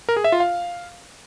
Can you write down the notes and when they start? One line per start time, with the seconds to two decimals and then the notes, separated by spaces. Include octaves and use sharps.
0.09 A#4
0.16 G#4
0.24 E5
0.32 F4
0.40 F5